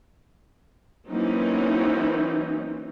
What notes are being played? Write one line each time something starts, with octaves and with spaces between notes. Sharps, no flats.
E3 F#3 A#3 C4 C#4 D#4